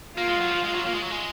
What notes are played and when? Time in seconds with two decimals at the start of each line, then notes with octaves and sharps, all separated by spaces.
0.17 A#3 F4
0.28 G#3
0.41 F#3
0.51 F3
0.64 G#3
0.74 F#3
0.87 A#3
0.94 G#3
1.02 F#3
1.11 G#3